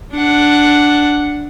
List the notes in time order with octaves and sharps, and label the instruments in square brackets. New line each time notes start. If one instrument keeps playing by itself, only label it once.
[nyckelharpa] D4 F#5